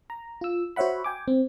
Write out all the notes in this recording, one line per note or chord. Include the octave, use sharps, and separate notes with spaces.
A#5
F4 E6
F#4 C5 C#5 E5 F#5 B5
G5 G#5 D6
C4